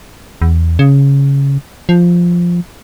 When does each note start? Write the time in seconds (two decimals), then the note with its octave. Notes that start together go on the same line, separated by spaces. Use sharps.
0.42 E2
0.79 C#3
1.89 F3